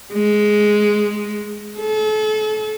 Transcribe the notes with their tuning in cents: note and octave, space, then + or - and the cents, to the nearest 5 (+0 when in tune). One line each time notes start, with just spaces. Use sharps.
G#3 +5
A4 -40